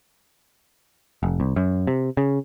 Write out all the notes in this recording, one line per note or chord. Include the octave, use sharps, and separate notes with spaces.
F1
C2
F#2
C3
C#3